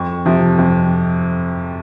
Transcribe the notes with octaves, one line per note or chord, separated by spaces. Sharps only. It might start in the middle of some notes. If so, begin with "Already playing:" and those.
Already playing: F2 C#6
C3 F3
F2